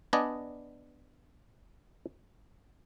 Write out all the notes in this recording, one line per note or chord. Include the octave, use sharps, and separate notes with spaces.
B3 D4 D5 D#5 G#5